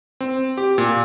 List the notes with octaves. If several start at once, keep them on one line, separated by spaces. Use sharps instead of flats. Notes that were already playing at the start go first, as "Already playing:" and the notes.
C4
G4
A#2